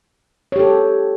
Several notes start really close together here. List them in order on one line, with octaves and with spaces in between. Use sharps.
C#5 G4 A4